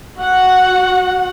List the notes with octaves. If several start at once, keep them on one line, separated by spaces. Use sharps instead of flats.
F#4 F#5